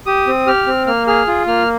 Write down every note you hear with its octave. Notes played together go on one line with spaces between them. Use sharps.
G4 D#6
C4
G4 F6
C4
A#3 F6
G#4 F6
F4
A#3 F6